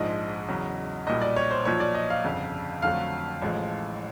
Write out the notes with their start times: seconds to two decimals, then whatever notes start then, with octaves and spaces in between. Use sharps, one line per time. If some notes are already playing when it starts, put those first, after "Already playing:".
Already playing: A#1 G#2 F3 G#3 D#5
0.49 E2 C#3 F#3
1.07 B1 A#2 G3 D#5
1.21 D5
1.36 C#5
1.51 C5
1.65 B1 A#2 F3 C#5
1.80 D5
1.95 D#5
2.10 F5
2.24 G1 F2 C#3
2.82 F2 D3 F#3 A3 F5
3.42 A1 A2 F3 G#3